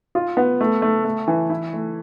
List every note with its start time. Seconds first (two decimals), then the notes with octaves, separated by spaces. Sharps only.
0.15 F4
0.37 B3
0.61 A3
0.82 A3
1.05 A3
1.28 E3
1.50 E4
1.73 A3